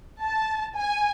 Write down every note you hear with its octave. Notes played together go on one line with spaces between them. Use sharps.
A5
G#5